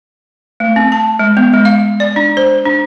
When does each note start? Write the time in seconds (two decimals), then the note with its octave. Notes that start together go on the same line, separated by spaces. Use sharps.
0.60 A3
0.76 C4
0.92 A5
1.19 G#3
1.37 B3
1.53 G#3
1.65 F5
2.00 D5
2.16 D4
2.37 C5
2.65 D4